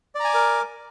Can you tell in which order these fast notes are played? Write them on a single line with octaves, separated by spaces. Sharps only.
D5 A#5 G#5 D6 A#4